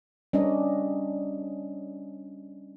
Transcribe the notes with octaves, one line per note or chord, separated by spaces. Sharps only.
G3 C#4 D4 D#5